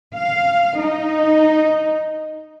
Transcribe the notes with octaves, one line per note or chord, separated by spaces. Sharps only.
F5
D#4